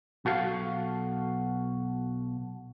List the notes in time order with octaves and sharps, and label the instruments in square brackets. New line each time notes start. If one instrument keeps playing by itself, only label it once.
[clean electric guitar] B1 F#4 A4 F5